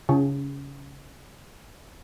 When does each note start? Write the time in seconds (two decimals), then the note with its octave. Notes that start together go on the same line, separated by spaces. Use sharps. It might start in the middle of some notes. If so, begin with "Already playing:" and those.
0.09 C#3